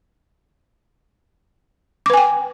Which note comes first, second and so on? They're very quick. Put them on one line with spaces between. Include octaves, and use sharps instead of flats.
D6 B4 G#5 G5